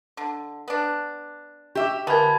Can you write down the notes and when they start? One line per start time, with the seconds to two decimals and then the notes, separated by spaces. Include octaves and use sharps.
0.17 D3
0.68 B3 D4
1.75 F#4 G4 E5 D6
2.07 D3 B3 F4 A#4 G#5 A5 B5 G#6